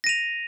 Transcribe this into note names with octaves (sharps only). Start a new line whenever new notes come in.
A#6 D#7 F7